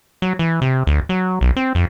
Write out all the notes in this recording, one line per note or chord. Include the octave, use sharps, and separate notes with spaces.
F#3
E3
C3
D2
F#3
B1
C4
F2